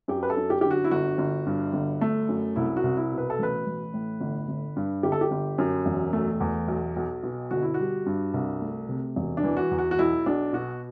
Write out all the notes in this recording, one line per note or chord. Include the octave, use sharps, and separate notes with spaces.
F#2 G4
B4
A4
F#2
G4
D3 G4
F#4
E4
G1 F#4
G1
G2
G1
A3
F#2
C2 E4
F#4
C2
E4
B2
B4
A4
A1 B4
A1
A2
G1
G1
G2
G1 G4
A4
G4
G1
F#2
E1
A3
E2
B1
B1
B2
G1 F#4
E4
G3 F#4
G2
C2
A3
C3
E1
D4
E3
F#4
E2
F#4
F#4
B1 E4
B1 D4
B2 F#4